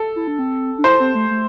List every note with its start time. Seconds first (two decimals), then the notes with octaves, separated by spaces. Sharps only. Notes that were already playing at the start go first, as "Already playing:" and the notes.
Already playing: A4
0.16 E4
0.27 D4
0.39 C4
0.78 D4
0.84 E4 C5
1.00 C4
1.15 A3
1.31 A3